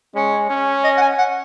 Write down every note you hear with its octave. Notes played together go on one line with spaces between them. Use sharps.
G#3 C#4
C#4
D#5
F#5
G#5
F#5